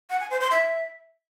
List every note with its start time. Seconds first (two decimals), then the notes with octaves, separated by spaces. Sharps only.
0.10 F#5
0.20 G#5
0.30 C5
0.41 C6
0.51 E5